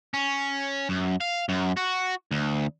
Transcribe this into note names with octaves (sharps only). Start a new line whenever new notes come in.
C#4
F#2
F5
F#2
F#4
D2